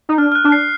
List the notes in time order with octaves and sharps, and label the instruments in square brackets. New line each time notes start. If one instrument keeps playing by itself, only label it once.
[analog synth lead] D#4
[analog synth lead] D4 [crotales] F6
[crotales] F6
F#6
[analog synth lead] D4
[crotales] C7